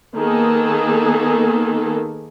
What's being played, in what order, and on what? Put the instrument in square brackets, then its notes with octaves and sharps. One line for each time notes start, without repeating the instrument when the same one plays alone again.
[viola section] D#3 A#3 B3 G#4 A4